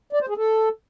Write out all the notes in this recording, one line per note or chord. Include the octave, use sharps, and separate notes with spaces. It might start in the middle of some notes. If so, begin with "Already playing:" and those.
D5
C5
G#4
A4